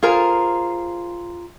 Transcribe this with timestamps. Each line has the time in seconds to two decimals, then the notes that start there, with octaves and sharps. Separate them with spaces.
0.03 F4 G#4 A#4 C5